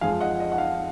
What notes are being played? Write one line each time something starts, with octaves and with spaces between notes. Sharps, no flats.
F2 F3 G#3 F5 G#5
D#5 F#5
D#5
F#5
F5